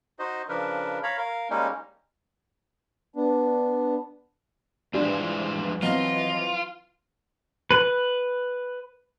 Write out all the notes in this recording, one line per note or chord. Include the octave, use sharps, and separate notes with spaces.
D#4 F#4 C5 D#5
C#3 F3 D4 A#4 B4
C#5 F5 A#5 B5
A#4 F5
G3 G#3 A#3 C#4 D#4
B3 D4
G2 E3 F3 G#3 D4 G4 C5
F#3 C4 F4 D#5
B4